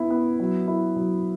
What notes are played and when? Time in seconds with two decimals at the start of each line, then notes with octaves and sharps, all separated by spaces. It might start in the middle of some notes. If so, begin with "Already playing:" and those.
Already playing: B3 E4
0.10 B3
0.40 F#3
0.68 E4
0.96 F#3